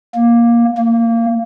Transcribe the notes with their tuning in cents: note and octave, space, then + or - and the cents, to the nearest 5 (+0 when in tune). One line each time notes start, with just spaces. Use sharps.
A#3 +10
A#3 -20